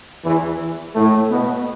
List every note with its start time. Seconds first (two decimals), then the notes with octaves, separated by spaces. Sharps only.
0.25 E2 E3
0.95 A2 A3
1.31 B2 B3